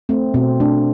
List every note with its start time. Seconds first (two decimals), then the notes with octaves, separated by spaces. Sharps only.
0.09 A3 C4
0.34 B2 C4
0.60 A3 D4